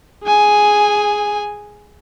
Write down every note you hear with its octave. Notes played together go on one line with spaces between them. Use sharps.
G#4 G#5